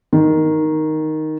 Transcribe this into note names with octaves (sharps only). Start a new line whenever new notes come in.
D#3